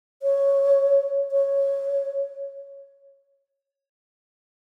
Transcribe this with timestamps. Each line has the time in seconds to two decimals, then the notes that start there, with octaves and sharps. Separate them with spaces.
0.23 C#5
1.32 C#5